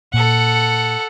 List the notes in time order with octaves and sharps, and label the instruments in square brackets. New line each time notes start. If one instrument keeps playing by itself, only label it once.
[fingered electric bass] A#2 [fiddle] A4 F#5